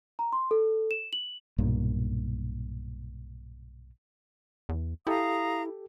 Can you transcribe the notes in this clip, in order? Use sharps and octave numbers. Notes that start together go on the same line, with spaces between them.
A#5
C6
A4
E7
F#7
B1 G2 A#2
E2
E4 G4 A4 F5 A#5 D#6